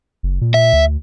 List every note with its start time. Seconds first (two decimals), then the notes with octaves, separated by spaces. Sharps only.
0.23 F#1
0.41 A#2
0.54 E5
0.73 D2